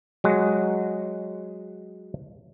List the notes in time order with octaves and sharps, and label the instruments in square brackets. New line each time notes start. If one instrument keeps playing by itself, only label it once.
[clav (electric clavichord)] F#3 G#3 F#5